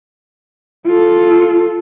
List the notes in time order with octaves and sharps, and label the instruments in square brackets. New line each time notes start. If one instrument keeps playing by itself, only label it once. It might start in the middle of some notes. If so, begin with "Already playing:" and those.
[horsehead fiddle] F4 A4